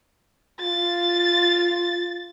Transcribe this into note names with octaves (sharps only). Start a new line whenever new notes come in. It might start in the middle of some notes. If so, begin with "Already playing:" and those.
F4 A6